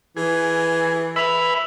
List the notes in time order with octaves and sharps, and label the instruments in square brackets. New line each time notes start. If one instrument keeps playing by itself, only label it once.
[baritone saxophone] E3 [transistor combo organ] G#4
[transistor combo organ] B4 E5 B5 [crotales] E6 F7